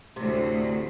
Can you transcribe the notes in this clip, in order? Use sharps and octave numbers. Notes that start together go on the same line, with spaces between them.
D2 A2 C3